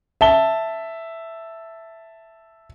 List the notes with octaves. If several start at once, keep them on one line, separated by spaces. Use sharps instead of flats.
E5 A5 G7